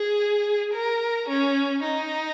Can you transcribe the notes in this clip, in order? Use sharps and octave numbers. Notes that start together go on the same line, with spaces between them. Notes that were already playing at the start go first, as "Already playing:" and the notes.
Already playing: G#4
A#4
C#4
D#4